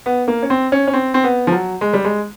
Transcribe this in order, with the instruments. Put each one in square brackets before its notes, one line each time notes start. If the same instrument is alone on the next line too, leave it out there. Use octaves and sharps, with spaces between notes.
[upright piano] B3
A#3
C#4
C4
C#4
C#4
C4
C4
B3
F3
F#3
G#3
G3
G#3